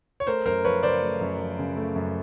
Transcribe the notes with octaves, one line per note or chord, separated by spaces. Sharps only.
C#5
A3 A#4 C5
F#2 A#4 C5
F3 B4 C#5
C#3 C5 D5
A3
F#2
F3
C#3
A3
F#2